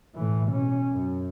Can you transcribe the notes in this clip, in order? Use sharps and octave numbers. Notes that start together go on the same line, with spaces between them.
A2 E3
B2 C#4
F#2